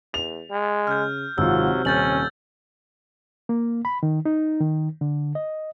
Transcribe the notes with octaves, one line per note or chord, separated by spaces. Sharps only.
E2 F7
G#3
C#3 F6 G6
G#1 C3 F#3 F4 E6
D#1 C#4 G6 A6 F#7
A#3
B5
D#3
D#4
D#3
D3
D#5